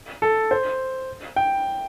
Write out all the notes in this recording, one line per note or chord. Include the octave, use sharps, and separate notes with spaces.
A4
C5
G5